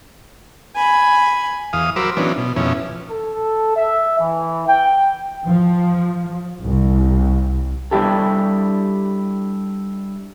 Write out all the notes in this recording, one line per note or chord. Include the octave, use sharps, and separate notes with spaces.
G#5 B5
E2 F5 D#6
F#3 A#4 C5 B5 D6 E6
E3 F#3 B3 C#4 D4
B2
F2 B2 C#4 E4
A4
E5
E3
G5
F3
C2
G3 D4 E4 G4 A4